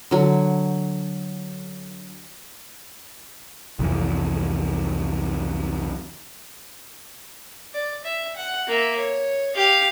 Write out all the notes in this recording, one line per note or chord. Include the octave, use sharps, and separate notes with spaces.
D3 F#3
C2 F2 E3
D5
E5
F#5
A#3 E5
C#5
G4 F5